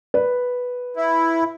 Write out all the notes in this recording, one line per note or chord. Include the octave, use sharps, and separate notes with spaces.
B4
E4